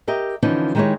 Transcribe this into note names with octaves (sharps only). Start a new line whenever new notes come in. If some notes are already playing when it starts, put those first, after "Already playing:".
G4 A#4 D#5 E5
D3 E3 F3 C#4 D#4
D#3 G#3 D#4 E4 G4 C#5